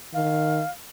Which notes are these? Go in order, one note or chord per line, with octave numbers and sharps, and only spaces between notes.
D#3 F5